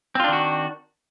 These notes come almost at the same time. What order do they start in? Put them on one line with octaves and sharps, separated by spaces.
C4 F4 D4 D#3 F#4